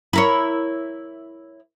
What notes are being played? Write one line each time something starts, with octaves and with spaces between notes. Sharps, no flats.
E4 A#4 C#5